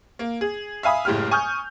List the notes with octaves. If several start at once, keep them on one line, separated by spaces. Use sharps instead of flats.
A#3
G#4
E5 F5 G#5 B5 D#6
F#1 A2 G#3 G4 F6
G#5 C#6 D#6 F6 G6